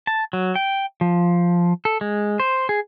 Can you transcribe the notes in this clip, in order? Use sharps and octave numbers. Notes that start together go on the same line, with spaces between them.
A5
F#3
G5
F3
A4
G#3
C5
G#4